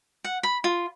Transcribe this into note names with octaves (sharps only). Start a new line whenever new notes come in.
F#5
B5
F4